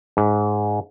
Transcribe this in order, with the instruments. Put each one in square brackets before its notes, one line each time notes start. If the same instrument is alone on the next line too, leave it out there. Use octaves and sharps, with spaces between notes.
[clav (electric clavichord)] G#2